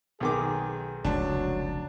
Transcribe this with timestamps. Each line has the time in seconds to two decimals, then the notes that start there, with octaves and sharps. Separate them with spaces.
0.20 B1 D#3 G#4 D6
1.04 F1 C#2 F#3 D4 A5